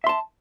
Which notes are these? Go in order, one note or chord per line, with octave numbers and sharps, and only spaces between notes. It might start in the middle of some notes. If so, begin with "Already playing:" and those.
E5 A5 C6